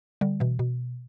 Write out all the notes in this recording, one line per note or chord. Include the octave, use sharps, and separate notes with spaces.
D3 G3
B2 E3
B2